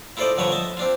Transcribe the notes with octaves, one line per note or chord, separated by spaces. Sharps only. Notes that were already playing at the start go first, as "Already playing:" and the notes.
E4 F4 A4 C5 D5 D#5
G2 D3 F3 B4 C#5 A#5
D#5 E5 A5
C4 D4 F4